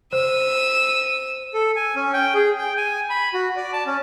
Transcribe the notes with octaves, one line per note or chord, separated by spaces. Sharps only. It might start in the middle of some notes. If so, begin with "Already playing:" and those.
C5 E6 D#7
A4
G#5
C#4
G5
G#4
G5
G#5
B5
F#4
D5
A5
C#4